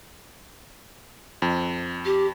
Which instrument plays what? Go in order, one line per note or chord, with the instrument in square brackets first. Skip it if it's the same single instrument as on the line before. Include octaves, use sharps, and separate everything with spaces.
[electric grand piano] F2
[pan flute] G4